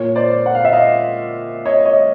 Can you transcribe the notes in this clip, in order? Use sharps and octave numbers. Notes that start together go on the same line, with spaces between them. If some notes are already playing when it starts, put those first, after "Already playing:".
Already playing: A#2 C#5
C5 D5
F#5
F5
E5
D#5 F5
C#5 D#5
C#5 D#5